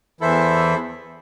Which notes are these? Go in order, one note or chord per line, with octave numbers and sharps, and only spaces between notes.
E2 E3 E4 A4 C5 E5